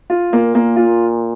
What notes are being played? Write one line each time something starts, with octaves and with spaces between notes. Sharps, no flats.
F4
A#2 A#3
A#3
F4